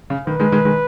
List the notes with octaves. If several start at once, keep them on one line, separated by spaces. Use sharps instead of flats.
C#3
D#3 B4
D#3 G#3
D#3 G#3
D#3 G#3